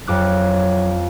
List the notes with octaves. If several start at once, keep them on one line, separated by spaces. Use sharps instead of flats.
F2 F#3 D6 F#6